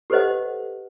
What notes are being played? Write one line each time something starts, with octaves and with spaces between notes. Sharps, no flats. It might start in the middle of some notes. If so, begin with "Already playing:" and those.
G4 A4 B4 C5 D#5 F#5